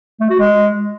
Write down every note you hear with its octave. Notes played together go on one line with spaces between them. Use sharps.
A3
F#4
G#3